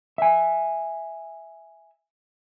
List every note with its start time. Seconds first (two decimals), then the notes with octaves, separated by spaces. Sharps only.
0.18 E5 G#5